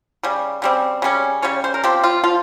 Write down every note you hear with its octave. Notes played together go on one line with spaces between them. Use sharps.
C#3 G3
C#3 G3 C4
C#3 G3 C#4
C#3 G3 C#4 C#5
C5
A#4
F3 C4 G4
F4
F3 F4